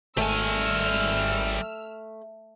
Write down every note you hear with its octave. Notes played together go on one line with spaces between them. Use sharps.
G#1 G3 A3 G#5 E6 F6